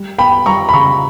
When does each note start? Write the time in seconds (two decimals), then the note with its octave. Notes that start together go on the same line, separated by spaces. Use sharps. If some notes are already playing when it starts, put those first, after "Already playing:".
Already playing: G3
0.18 B3 G5 B5
0.46 G3 A#5 C#6
0.69 B5
0.73 C#3 A#5 C#6